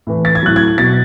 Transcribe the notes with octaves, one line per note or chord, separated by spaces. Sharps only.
A2 E3
A6
G#6
A2 F#3 F#6
G#6
B2 F#3 A6